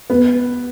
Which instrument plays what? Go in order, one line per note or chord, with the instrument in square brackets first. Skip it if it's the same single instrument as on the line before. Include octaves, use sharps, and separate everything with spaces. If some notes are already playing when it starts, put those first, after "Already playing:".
[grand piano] B3